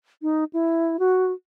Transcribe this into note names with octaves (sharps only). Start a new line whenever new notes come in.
D#4
E4
F#4